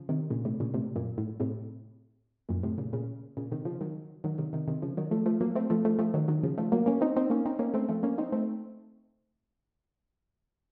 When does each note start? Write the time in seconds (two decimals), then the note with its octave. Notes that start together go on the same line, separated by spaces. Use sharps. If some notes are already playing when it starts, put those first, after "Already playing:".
Already playing: C#3 F3
0.09 C3 D#3
0.30 A#2 C#3
0.45 A2 C3
0.60 A#2 C#3
0.74 A2 C3
0.96 F#2 A#2
1.18 A2
1.40 A2 C3
2.49 F#2 A#2
2.63 A2 C3
2.78 A#2 C#3
2.93 A#2 C#3
3.37 A#2 C#3
3.52 C3 D#3
3.65 C#3 F3
3.81 D#3 F#3
4.24 D#3 F#3
4.38 C3 D#3
4.53 C3 D#3
4.68 C3 D#3
4.82 C#3 F3
4.97 D#3 F#3
5.11 F3 A3
5.26 F3 A3
5.41 F#3 A#3
5.55 A3 C4
5.70 F3 A3
5.85 F3 A3
5.99 F3 A3
6.14 D#3 F#3
6.28 D#3 F#3
6.43 C#3 F3
6.58 F3 A3
6.72 F#3 A#3
6.86 A#3 C#4
7.01 C4 D#4
7.16 C4 D#4
7.30 A#3 C#4
7.46 C4 D#4
7.59 A#3 C#4
7.74 A3 C4
7.89 F3 A3
8.03 A#3 C#4
8.18 C4 D#4
8.32 A3 C4